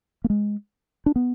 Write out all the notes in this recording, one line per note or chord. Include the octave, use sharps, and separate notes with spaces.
A#3
G#3
D4
B3